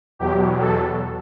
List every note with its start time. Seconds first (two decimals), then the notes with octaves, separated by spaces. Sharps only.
0.19 E2 B2 F#3 G4
0.59 A4